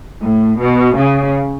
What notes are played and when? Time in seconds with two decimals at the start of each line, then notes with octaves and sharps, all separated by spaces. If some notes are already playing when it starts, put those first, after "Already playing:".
0.22 A2
0.58 B2
0.95 C#3